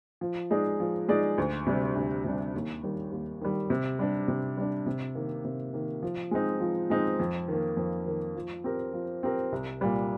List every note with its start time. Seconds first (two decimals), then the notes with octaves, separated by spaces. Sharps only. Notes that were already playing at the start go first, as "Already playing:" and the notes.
0.21 F3
0.51 G#3 D#4 G#4 D5
0.80 F3
1.09 G#3 D#4 G#4 D5
1.38 D2
1.67 C3 G3 D4
1.96 D2
2.24 C3 G3 D4
2.55 D#2
2.83 D#3 G3
3.12 D#2
3.41 D#3 G3
3.70 C3
3.99 G3 D4
4.28 C3
4.57 G3 D4
4.86 C3
5.15 D#3 A#3
5.45 C3
5.74 D#3 A#3
6.03 F3
6.31 G#3 C4 D#4
6.60 F3
6.90 G#3 C4 D#4
7.20 F2
7.48 D#3 A#3
7.77 F2
8.06 D#3 A#3
8.35 F3
8.64 C4 G4 A#4
8.93 F3
9.23 C4 G4 A#4
9.52 C2
9.81 A#2 G3